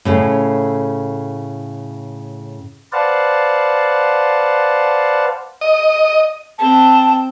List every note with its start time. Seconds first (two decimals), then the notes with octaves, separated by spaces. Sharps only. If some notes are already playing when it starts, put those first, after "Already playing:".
0.05 A2 C#3
2.93 B4 C5 D5 F5 F#5 A5
5.61 D#5
6.58 C4 G5 A5